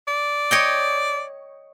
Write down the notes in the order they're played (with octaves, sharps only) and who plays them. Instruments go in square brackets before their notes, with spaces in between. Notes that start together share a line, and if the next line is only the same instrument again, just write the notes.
[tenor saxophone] D5
[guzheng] C#5 D#5 G5